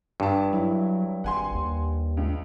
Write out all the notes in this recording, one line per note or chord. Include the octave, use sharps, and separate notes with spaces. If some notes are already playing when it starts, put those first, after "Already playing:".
G1 G2 A5
F#3 E4
G#1 F#5 G#5 C6
D#2
C#2